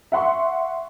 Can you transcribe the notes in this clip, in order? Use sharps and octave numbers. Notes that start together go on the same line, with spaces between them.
E5 F#5 C6 C#6